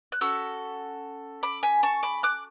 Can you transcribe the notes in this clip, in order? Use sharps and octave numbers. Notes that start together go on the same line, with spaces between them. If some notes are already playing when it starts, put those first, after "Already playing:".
F#6
C#4 F#4 A4 C#6 E6
B5 D6
G#5 B5
A5 C#6
B5 D6
D6 F#6